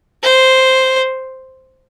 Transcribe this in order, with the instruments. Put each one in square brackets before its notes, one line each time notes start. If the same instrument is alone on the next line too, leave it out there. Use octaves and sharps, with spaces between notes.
[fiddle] C5